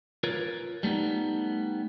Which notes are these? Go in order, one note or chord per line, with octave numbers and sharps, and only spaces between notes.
F4 A#4 B4 C#5
G3 A3 B3 D#4